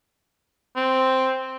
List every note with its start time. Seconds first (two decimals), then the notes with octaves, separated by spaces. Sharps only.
0.76 C4